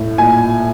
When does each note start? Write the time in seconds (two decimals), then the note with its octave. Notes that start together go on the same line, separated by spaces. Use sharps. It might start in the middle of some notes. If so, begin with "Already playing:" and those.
Already playing: A2
0.18 A#2 G#5